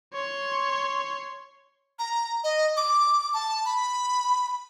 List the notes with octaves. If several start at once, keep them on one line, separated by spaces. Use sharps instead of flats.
C#5 C6
A#5
D#5
D6
A5
B5